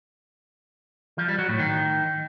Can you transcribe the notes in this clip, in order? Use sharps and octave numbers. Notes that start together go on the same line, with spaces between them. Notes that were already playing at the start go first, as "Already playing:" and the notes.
F3
G3
F#3
A2
D#3